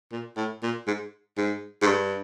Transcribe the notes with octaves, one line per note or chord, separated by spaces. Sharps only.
A#2
A2
A#2
G#2
G#2
G#2
G2